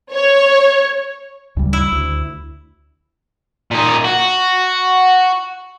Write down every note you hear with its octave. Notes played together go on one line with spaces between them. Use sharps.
C#5
D2 C#3 G3
E4
D2
A#2 D#4
F#4